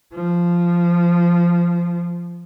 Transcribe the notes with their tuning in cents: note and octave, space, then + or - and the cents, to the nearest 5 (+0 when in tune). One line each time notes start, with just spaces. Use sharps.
F3 -10